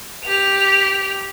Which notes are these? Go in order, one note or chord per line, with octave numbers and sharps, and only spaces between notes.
G4 F7